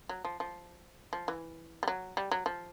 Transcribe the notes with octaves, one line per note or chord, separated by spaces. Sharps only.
F#3
F3
F3
F3
E3
G3
F#3
G3
F#3
F3